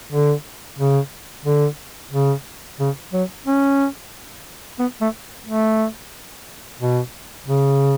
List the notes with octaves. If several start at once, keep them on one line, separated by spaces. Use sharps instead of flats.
D3
C#3
D3
C#3
C#3
F#3
C#4
B3
A3
A3
B2
C#3